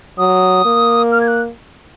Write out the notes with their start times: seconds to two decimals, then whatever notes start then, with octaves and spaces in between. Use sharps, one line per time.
0.18 F#3 D#6
0.65 A#3
1.12 F6
1.21 G#6
1.28 F#6